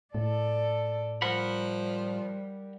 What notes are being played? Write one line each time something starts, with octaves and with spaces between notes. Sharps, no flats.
A2 A4 D5
F3 G3 A#4 F#5 B5